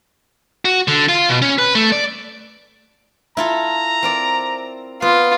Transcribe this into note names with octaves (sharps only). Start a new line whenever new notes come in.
F#4
D3
F4
B2
C#4
B4
A3
D5
E4 F4 A4 A#5
C4 A#4 D5
B3 F4